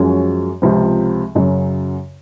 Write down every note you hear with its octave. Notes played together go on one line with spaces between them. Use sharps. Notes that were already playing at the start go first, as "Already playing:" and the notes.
Already playing: F#2 F3 G#3 C#4 F#4
C#2 C3 F3 C4
F#2 C#3 F#3